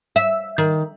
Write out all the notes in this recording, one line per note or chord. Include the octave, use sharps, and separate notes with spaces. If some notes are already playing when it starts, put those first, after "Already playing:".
E5
D#3